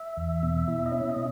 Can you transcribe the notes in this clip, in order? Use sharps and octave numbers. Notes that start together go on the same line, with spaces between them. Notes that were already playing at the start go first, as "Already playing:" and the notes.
Already playing: E5
E2
B2
E4
D#5
C#4 E5
D#5
B2